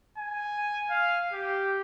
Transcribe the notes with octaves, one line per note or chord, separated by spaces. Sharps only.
G#5
F5
G4